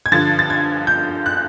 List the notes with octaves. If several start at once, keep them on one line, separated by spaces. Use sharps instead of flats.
G#6
G2 D3 F3 A6
A6
G#6
G6
F#6